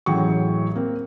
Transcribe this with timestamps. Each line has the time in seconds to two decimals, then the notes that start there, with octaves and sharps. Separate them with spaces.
0.06 A1 A2 F#3 G#4 G5 C#6
0.75 A#3 C4